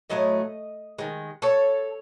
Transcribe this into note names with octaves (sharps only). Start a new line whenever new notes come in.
A2 F#3 A3 D#5
D#3 G#3
A4 C#5